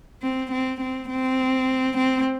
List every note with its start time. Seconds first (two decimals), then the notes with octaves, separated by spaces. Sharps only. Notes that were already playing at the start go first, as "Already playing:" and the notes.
0.22 C4
0.52 C4
0.81 C4
1.10 C4
1.97 C4